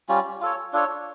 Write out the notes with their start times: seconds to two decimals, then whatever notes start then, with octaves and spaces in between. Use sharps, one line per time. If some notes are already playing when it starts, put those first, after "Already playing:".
0.09 G3 C#4 F4
0.41 F4 A4 C#5
0.73 D4 F4 A4 C#5